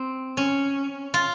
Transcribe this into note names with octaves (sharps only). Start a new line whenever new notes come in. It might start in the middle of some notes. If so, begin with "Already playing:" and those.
Already playing: C4
C#4
F4